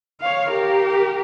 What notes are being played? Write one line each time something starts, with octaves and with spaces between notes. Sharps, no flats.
C#5 F5
G4 A#4